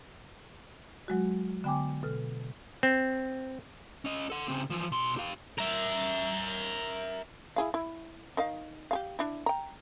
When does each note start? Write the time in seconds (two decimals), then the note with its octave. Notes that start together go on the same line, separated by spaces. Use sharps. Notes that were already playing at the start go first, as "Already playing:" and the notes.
1.08 F#3 G#3 F#4
1.64 D3 B3 G5 G#5 D6
2.03 B2 A4 F6
2.83 C4
4.05 C#4 D#5
4.30 A4 F#5
4.48 C#3 C4
4.70 E3 F3
4.92 B2 C6
5.17 G4 F5
5.58 A#4 E5
7.56 E4 G#4 F5
7.74 E4
8.37 D#3 D#4 F5
8.91 G4 G#4 F5
9.19 D4 E4
9.46 G5 A#5